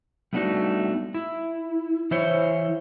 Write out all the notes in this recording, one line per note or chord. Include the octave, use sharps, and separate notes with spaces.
G3 A3 B3 D4 D#4 F#4
E4
E3 E4 C5 C#5